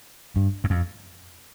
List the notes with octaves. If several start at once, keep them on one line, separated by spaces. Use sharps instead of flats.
G2
F#2
F2